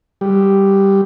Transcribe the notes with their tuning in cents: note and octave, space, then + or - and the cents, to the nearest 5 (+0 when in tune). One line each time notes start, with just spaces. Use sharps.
G3 +0 G4 +0